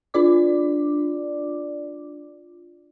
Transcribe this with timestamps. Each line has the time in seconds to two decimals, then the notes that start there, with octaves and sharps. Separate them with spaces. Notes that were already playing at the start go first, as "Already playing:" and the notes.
0.14 D4 F4 D5 D6